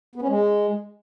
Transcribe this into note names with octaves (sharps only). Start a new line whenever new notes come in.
B3
C#4
G#3